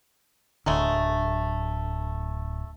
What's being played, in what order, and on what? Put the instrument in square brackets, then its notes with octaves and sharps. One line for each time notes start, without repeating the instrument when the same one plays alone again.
[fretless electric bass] D1 D3 [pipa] F#3 G#3 A3